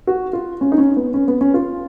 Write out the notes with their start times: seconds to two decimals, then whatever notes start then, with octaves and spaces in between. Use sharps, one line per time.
0.07 F#4
0.33 F4
0.61 C#4
0.72 D#4
0.78 C#4
0.96 B3
1.14 C#4
1.28 B3
1.41 C#4
1.54 F4